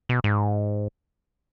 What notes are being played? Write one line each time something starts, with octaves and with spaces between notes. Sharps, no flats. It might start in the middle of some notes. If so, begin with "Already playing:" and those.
B2
G#2